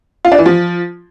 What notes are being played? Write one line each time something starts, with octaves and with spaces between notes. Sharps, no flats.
F4
D4
E3
F3